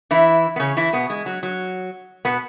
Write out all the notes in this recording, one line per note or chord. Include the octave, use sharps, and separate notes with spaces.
E3 E4
B3
C#3 C#4
E3 E4
B2 B3
G#3
F#3
F#3
B2 B3